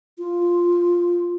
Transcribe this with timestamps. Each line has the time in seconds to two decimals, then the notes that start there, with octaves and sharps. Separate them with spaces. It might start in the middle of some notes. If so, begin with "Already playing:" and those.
0.18 F4